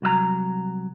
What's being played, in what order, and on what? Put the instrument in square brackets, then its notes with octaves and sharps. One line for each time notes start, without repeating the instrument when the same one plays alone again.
[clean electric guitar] C2 F#3 E5 A#5